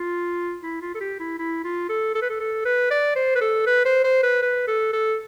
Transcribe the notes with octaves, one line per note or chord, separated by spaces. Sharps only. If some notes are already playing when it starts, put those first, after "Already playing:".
Already playing: F4
E4
F4
A4
G4
E4
E4
F4
A4
A4
B4
A4
A4
B4
D5
C5
B4
A4
B4
C5
C5
B4
B4
A4
A4